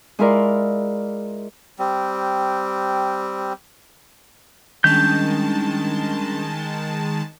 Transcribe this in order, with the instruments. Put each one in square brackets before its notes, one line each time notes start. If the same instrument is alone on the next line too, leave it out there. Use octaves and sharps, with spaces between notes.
[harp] G#3 E4 F4 A#4 D5
[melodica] G3 C4
[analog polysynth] D#3 G#3 A5 [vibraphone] G3 C#4 D4 [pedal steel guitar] G6